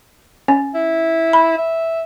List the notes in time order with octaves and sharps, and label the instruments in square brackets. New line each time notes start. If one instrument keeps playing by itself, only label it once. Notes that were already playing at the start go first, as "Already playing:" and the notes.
[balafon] C#4
[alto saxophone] E4
[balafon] B5
[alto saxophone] E5